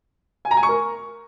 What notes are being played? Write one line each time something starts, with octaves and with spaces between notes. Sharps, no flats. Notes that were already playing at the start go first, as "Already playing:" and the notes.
G#5
A#5
G#5
C#6
A#4